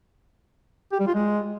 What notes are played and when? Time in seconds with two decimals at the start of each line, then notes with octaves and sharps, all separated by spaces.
0.92 G4
1.00 G3
1.07 F4
1.15 G#3